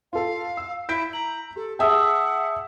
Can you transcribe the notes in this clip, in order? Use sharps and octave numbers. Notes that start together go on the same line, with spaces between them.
F4 A4 F5
E6
E4 G6 B6 D7
A#5 F#7
G4 A4
G#4 E5 F#5 G5 A5 D#6 E6